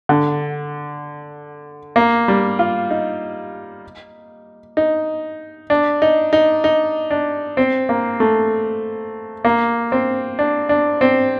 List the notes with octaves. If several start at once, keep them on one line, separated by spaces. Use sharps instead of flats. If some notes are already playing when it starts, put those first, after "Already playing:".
D3
A#3
G3
F4
D#4
D#4
D4
D#4
D#4
D#4
D4
C4
A#3
A3
A#3
C4
D4
D4
C4